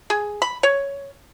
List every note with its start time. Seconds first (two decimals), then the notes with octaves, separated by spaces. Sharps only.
0.10 G#4
0.42 B5
0.63 C#5